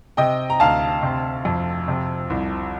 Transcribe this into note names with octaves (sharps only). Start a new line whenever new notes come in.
C3 D#5 G5
A#5
D2 F5 A5
C3
F2
C3
C2